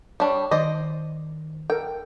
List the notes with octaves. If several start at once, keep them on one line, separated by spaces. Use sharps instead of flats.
G3 D4 C#5 A5 C#6
D#3 C5 D5 D#5
A4 A#4 G5